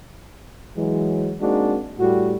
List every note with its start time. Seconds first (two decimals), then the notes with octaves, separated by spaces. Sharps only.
0.77 E3 F#3 G#3
1.40 G#3 A#3 C4 D4 D#4 F#4
1.99 A2 G3 F#4